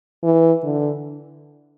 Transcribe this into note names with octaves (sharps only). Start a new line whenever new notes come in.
E3
D3